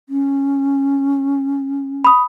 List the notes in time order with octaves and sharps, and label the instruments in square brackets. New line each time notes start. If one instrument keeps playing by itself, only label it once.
[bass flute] C#4
[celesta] B5 D#6